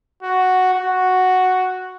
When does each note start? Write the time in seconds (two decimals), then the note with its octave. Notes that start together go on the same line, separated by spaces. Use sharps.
0.23 F#4
0.73 F#4